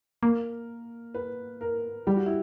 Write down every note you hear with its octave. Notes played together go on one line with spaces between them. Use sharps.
A#3 A#4
B4
A#4
G3 G4
F#4
E4